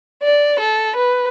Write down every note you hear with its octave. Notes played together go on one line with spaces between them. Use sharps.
D5
A4
B4